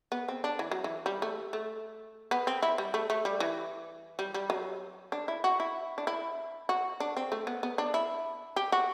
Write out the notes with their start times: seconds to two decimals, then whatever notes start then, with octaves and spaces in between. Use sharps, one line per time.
0.12 B3
0.28 C4
0.44 D4
0.59 E3
0.71 F#3
0.84 E3
1.06 G3
1.22 A3
1.53 A3
2.31 B3
2.47 C4
2.62 E4
2.78 G3
2.94 A3
3.10 A3
3.25 G3
3.40 E3
4.19 G3
4.34 G3
4.50 F#3
5.12 D4
5.28 E4
5.44 F#4
5.60 E4
5.98 D4
6.07 E4
6.69 F#4
7.00 D4
7.17 C4
7.32 A3
7.47 B3
7.63 B3
7.78 D4
7.94 E4
8.56 G4
8.72 F#4